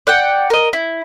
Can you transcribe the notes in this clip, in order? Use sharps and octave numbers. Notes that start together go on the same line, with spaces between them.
D5 F#5 G5
A#4 D#5
E4